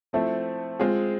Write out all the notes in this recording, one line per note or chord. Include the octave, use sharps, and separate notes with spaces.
F3 A3 C4 E4
G#3 C4 F4 G#4